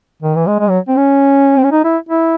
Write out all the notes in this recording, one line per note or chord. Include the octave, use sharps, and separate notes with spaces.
D#3
E3
G#3
G#3
F#3
C4
C#4
C4
C#4
D#4
E4
E4